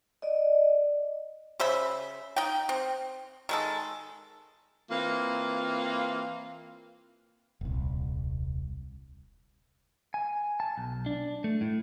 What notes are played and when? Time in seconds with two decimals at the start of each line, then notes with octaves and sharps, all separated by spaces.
0.22 D5 D#5
1.60 C#3 C5 E5 B5
2.36 D#4 G5
2.69 C4
3.49 D#3 G#3 A4
4.90 E3 A#3 C4 F4
7.61 D#1 C2
10.14 G#5
10.60 A5
10.77 B1
11.06 D4
11.44 A3
11.61 A2